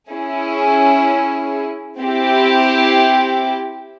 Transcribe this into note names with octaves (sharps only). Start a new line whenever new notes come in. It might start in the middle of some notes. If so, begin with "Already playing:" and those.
C#4 E4 G#4
C4 E4 G4